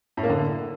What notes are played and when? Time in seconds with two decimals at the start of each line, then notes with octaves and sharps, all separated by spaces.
0.17 A2
0.23 A#3
0.29 D3